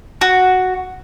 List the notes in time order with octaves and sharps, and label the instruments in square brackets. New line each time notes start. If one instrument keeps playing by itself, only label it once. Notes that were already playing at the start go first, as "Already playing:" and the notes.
[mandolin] F#4